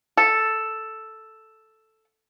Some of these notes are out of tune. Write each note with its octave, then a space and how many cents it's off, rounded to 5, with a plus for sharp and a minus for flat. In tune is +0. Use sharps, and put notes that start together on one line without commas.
A4 +0